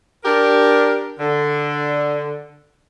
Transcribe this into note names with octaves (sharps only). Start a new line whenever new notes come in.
D4 G4 A#4
D3